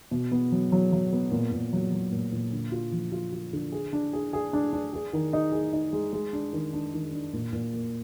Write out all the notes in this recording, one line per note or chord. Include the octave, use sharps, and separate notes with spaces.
B2
B3
F#3
F#3
F#3
B3
A#2
A#2
F#3
F#3
A#2
A#2
D3
F4
F3
F4
F4
D3
G#4
D4
G#4
G#4
D4
D4
G#4
D#3
D#4
G#4
D#4
G#3
G#3
D4
D#3
D4
D#3
D4
A#2
A#2
A#3